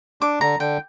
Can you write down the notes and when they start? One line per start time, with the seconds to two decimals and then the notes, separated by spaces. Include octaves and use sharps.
0.21 D4 D6
0.41 D3 A#5
0.60 D3 G5